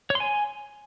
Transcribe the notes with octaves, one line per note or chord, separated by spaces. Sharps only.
C#5
C6
G#5